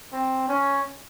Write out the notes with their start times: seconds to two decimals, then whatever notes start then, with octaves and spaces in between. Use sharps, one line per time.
0.13 C4
0.48 C#4